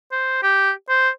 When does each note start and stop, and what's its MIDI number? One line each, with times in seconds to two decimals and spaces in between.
0.12 0.39 72
0.43 0.71 67
0.89 1.09 72